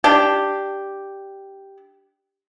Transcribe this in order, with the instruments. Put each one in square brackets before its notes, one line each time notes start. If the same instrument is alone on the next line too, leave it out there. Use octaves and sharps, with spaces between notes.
[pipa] D4 G4